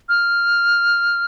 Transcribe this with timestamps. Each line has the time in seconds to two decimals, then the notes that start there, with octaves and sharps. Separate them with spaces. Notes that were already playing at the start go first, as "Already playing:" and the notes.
0.09 F6